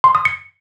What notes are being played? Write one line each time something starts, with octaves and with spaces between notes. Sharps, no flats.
C6
D#6
C#7